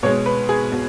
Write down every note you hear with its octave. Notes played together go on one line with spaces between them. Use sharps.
B2 G#3 C#5
B4
G#4
B2